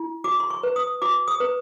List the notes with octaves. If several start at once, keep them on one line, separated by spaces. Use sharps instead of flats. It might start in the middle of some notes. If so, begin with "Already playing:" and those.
Already playing: E4
F#4 D6
C6
C#6
B4
D#6
F#4 D6
D#6
B4